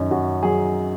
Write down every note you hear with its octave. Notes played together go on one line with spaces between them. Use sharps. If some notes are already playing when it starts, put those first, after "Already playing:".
Already playing: F#2 D#3 C#4 D#4
F#2 F#4
F#3 G#4